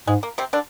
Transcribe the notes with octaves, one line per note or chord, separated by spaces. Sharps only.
G#2 G#3
A#3
C3 C4
D3 D4